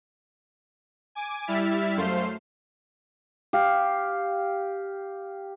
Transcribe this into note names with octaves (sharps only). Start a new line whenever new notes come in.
G#5 D6
G3 E4 E5 F6 A6 B6
F#2 A3 C5 F5 C6 C7
G4 F5